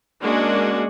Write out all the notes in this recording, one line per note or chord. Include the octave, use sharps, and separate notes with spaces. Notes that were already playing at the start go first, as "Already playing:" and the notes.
G#3 A#3 C#4 D4 F#4